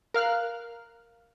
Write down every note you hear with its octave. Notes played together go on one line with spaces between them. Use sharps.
A#4 F5 F6 F#6